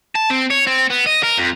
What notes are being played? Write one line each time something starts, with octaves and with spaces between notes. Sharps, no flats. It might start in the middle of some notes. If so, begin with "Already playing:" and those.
A5
C4
C#5
C4
B3
D#5
A#4
F2